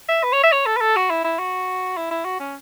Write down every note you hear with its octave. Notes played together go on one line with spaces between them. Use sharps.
E5
B4
C#5
E5
C#5
A4
B4
A4
F#4
E4
E4
F#4
E4
E4
F#4
C#4